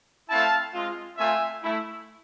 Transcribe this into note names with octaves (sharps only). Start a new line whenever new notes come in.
A3 C4 E4 F5 A5
G#3 C4 F4
A3 C4 F4 E5 G#5
A3 E4